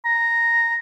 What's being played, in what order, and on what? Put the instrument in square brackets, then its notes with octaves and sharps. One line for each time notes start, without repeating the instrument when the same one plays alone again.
[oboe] A#5